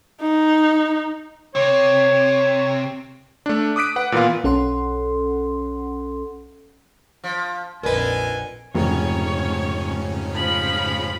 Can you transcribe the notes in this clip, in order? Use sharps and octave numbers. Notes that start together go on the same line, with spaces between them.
D#4
C3 C#5
A3 D4
D6 D#6 F#6 B6 D7
B4 F#5
A#2 E3 B3 F4
B1 C#4 A4 F#5 C6
F3
A#1 F2 D3 D#4 A#4 B4 G#5
F1 G#2 C#3 C#4 C#5
F3 B5